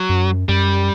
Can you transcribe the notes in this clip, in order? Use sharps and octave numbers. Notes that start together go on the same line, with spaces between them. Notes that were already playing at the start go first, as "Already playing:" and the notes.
Already playing: F#3
F#2
F#2 G3